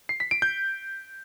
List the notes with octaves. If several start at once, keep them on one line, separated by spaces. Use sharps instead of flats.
C7
B6
D7
G6